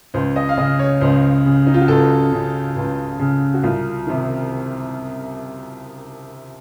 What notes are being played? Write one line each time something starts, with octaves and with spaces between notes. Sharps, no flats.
C#2 C5
D#5
F5
C#3 D#5
C#5
C#2 C5
C#3
D#4
F4
F#4
C#2 A4
C#3
C#2
C#3
F#4
C2 F4
C3 D#3